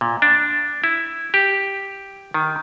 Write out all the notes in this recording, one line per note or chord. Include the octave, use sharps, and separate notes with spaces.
A#2
D4
E4
G4
D#3